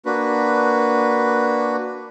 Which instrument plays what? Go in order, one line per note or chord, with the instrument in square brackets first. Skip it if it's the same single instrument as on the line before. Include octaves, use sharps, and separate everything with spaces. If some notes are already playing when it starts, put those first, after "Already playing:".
[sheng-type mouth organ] A#3 D4 F#4 B4